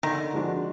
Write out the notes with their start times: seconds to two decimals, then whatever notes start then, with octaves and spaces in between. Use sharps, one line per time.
0.03 D3 D#3
0.33 F3 G#3 D4 F#4